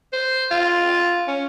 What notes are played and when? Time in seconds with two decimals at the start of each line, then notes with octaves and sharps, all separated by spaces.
0.13 C5
0.51 F4
1.27 C#4